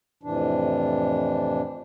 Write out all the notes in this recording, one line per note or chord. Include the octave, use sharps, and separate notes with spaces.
F2 A2 C3 E3 D4